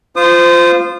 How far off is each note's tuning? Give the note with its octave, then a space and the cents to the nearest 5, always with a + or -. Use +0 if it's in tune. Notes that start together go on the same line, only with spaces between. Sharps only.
F4 +0 C5 -20 D#6 -30